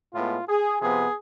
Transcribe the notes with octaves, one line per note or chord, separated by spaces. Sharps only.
A2 G#3 B3 F4
G#4
C3 F3 B3 G#4